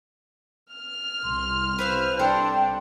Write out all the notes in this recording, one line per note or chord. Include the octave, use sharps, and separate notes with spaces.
F6
C2 C6
B4 C5 E5 F5
D4 A4 C5 G5